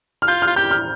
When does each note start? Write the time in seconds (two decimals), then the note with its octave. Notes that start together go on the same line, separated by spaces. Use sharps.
0.22 F6
0.27 F4 G6
0.42 F6
0.47 F4
0.56 G4 G6
0.71 F6